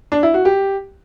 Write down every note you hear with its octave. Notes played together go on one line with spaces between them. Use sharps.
D4
E4
F#4
G4